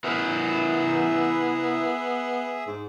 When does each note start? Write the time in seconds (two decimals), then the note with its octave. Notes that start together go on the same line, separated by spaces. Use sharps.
0.04 B3 E4 G#4 A#4 B4 E5
2.67 G#2